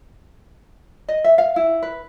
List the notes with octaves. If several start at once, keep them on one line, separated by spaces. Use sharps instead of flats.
D#5
E5
F5
E4
B4